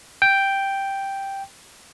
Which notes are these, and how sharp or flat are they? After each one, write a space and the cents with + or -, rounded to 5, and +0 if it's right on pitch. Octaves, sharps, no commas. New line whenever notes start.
G5 +0